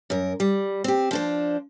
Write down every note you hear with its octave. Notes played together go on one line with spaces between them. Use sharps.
F#2 A#4
G3
C4 G4
F3 D4 C5